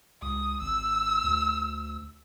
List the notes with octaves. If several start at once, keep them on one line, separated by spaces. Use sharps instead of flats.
C#2 D#6
G#1 E6
D2